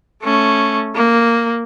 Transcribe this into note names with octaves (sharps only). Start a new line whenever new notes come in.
A3 C#4
A#3